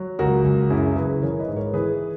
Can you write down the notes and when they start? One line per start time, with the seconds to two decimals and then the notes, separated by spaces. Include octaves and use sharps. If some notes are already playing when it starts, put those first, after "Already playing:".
Already playing: F#3
0.19 C#2 F#4 A#4
0.44 C#2
0.70 F#2 E4 G#4
0.96 F#1 G#4 B4
1.22 E3 A#4 C#5
1.39 B4 D#5
1.48 G#2
1.56 A#4 C#5
1.73 E3 G#4 B4